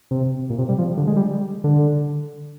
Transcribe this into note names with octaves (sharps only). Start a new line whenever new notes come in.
C3
A#2
C3
G3
F3
D3
G#3
G3
D3